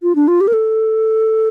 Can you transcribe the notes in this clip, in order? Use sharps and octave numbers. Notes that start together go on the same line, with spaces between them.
F4
D4
F4
G4
A#4
A4